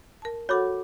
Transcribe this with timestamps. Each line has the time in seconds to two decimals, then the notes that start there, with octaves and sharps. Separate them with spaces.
0.22 A#4 A5
0.49 F#4 A4 C#5 F#5 B5 D6